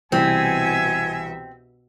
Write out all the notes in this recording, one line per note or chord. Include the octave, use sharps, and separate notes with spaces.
C2 B2 E3 C4 E5 G#5